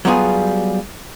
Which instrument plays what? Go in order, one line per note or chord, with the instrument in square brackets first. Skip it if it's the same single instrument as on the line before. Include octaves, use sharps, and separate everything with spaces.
[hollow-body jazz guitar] F#3 G3 B3 F4 G#4